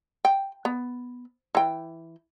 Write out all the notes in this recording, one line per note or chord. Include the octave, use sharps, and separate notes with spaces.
G5
B3
E3 G5